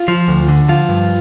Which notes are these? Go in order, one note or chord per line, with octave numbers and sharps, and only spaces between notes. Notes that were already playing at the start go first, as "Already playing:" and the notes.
Already playing: F4
F3
D2
D3
F3 F4
G2